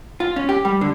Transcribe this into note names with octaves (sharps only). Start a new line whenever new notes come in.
F4
C#4
G4
G3
D3